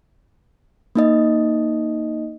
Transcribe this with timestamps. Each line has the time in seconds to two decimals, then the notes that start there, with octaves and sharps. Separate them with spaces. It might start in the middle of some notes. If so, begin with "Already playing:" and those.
0.95 A#3 D#4 D#5